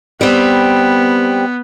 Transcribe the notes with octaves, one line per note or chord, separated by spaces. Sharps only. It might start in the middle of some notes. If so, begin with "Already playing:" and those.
G3 B3 C4